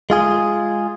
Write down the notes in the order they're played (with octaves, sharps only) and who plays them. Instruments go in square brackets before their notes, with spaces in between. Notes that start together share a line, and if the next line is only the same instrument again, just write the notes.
[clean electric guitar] G#3 F4 G#4